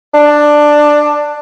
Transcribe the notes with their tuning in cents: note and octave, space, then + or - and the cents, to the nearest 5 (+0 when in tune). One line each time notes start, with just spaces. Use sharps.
D4 +10